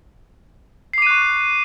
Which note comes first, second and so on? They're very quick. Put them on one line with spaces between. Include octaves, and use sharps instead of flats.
C7 D6 D#7 F#6 C#6